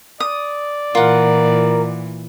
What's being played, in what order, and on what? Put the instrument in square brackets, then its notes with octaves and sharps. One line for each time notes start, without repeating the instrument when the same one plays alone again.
[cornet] D5 [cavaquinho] D#6
[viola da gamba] A#2 E3 [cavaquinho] F4 F#5 [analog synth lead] A#4